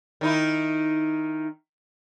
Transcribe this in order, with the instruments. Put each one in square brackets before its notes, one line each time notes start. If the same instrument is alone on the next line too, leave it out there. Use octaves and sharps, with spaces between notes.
[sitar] D#3 D#4 E4